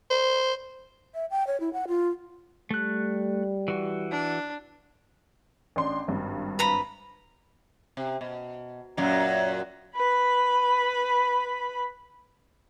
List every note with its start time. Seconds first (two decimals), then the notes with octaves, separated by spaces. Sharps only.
0.10 C5
1.15 E5
1.31 G5
1.47 C#5
1.60 E4
1.73 F#5
1.88 F4
2.71 G3 A3 F#6
3.68 E3 F#4
4.11 D4
5.76 A1 D4 C6
6.08 G#1 G2
6.59 B4 A#5 B5
7.97 C3
8.21 B2
8.97 F#2 A#2 F#3
9.95 B4 B5